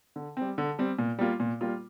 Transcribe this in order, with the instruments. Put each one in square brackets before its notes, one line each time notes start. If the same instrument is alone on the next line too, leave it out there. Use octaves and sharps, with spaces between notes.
[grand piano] D3
G3 C4
D3
G3 C4
A#2
G3 A#3 F4
A#2
G3 A#3 F4